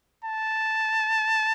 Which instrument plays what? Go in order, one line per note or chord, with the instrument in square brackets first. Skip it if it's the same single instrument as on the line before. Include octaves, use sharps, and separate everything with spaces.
[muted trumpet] A5